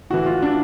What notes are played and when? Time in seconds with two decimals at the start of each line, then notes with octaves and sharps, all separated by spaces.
0.10 A2 E3 F#4
0.26 F4
0.42 D4